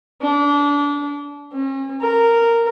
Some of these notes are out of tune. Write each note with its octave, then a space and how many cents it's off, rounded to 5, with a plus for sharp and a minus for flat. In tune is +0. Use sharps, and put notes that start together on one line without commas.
D4 -30
C#4 -40
A#4 -10